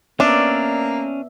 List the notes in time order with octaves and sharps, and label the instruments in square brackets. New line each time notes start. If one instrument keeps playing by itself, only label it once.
[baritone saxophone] A#3 [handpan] B3 D5 E5 [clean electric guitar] C#4 [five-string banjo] D4